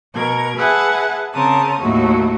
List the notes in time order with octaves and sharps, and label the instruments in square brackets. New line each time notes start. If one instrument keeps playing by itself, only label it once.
[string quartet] B2 A#4 G#6
G#4 B4 E5 F#5 G#5 A5
C#3 C4 A#4 A5 D#6
D#2 A2 F#3 A3 F#4